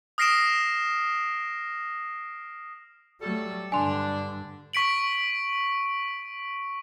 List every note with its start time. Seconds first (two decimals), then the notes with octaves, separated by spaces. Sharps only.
0.18 D#6 F6 A#6 C7 D7 E7
3.21 F#3 G3 A3 A4
3.72 G2 D3 D4 G#5 C6
4.73 C#6 B6 D7 F#7